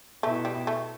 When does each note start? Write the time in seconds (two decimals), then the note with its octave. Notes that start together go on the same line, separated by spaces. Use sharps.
0.23 B2 A3 B3 E4
0.45 G3
0.67 A3